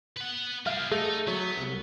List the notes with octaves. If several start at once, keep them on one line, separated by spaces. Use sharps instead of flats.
B4 F#5
G3 G#4 E5 F5 F6
A3 D#4 G#4
F#3 B3
C2